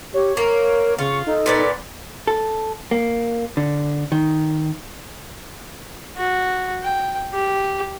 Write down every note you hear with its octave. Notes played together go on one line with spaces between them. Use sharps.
G4 C#5
A#3 A#4
C#3 F4 C#6
D#4 A4
A#2 B3 D5
A4
A#3
D3
D#3
F#4
G5
G4